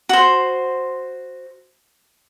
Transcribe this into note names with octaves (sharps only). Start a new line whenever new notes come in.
F#4 C5